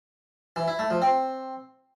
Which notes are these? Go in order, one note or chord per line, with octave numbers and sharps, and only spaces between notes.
E3
E4
A3
F3
C4